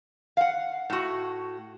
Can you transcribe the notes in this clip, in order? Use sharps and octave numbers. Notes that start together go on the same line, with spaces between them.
F5 F#5
A2 F#4